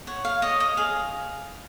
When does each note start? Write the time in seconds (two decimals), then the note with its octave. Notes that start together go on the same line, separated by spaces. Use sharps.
0.07 C#5 F#5
0.25 F5
0.42 C#5 D#5
0.60 D#5
0.77 G#4 F5